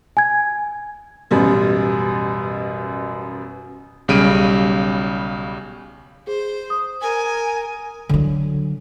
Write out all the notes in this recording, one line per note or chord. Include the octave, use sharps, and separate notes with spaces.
G#5 G#6
A1 F#2 B2 G3
B1 C#3 G3 D7 D#7
G#4 C5
D#6
A#4 G#5
D3 F#3